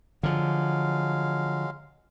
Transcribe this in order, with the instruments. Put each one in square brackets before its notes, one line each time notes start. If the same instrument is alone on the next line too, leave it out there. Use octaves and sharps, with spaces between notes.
[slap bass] D3 F3 [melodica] F#3 G#3 F5